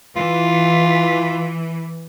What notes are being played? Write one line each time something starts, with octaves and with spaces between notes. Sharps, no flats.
E3 F4